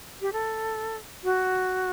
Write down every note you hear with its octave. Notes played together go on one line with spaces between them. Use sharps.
G4
A4
F#4